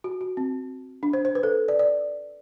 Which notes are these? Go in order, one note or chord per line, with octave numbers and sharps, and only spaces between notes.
F#4
F#4
C4
D4
C5
C5
B4
A4
D5
D5